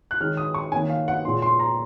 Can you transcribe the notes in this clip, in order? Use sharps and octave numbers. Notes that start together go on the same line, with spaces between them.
F#6
D#3 G#3 C#4 F6
D#6
C#6
D#3 A#3 C#4 G#5
F5
F#5
A#2 G#3 C#4 C6
C6
A#5